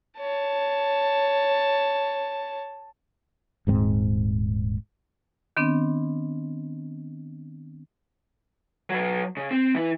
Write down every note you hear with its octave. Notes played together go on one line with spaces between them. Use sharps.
C#5 A5
D#1 G#2 A#3 C4
D#3 B3 C4 D4
F#3 B4
C#3
C4
E3 E4